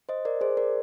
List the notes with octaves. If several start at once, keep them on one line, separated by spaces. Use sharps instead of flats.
C5 D#5
A#4 D5
G#4 C5
A#4 D5